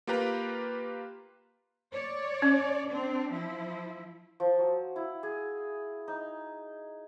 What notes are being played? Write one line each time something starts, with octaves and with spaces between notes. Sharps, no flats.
A#3 F4 G4 B4 A#5
C#5 D5
C#4
C4 D4
F3 E4
F3
F#3
E4
G#4
D#4